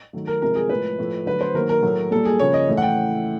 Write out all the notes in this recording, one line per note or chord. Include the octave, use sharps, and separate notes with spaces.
D#3 F#3 A3
A#4
C3 F3 G#3 A#4
G#4
A2 F3 G#3 B4
A2 F3 A3
D3 F#3 A3 B4
C5
D#3 F#3 A#3 A#4
A#4
A2 F#3 A3
A#2 G3 A#3 A4
G#4
C#3 F3 A#3 C#5
D#5
A2 E3 A3
F#5
G5